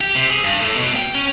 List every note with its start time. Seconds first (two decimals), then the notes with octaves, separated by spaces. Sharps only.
0.01 G4
0.15 C3
0.30 G#4
0.44 G2
0.61 A2
0.76 B2
0.96 G5
1.15 C#4